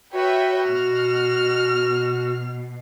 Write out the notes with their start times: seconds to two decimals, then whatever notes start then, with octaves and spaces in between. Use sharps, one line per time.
0.13 F#4 B4 C#5 E5 G5
0.69 B2 F6